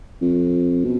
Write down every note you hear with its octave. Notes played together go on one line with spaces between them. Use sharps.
F2
B2